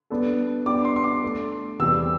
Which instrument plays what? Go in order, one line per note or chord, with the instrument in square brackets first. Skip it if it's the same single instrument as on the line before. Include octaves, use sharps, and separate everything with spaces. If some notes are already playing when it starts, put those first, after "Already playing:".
[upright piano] G3 B3 D4 A4
[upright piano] G3 B3 D4 G4 [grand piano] D6
[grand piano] C6
C6
D6
[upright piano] A3 D4 A4
[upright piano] E2 C3 G3 [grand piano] E6